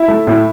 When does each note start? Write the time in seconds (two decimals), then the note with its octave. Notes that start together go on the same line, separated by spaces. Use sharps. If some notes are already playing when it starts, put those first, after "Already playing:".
Already playing: E4 E5
0.08 A3
0.27 A2